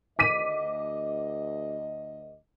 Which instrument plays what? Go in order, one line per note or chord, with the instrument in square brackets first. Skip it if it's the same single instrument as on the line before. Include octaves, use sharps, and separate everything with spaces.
[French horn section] D2 D#5 [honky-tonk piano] D6 B6 D#7